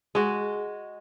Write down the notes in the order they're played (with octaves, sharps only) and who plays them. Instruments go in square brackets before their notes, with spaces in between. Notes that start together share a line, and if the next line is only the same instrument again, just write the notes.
[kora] G#3 F#4